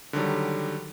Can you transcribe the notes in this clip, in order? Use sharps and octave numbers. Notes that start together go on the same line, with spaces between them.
D3 D#3 F#3 G3